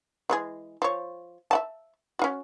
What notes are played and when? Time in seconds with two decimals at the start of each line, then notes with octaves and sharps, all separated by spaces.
0.30 E3 G#3 G#4
0.82 F3 C#5
1.51 E5 F#5 A5
2.19 C#4 F4 F#4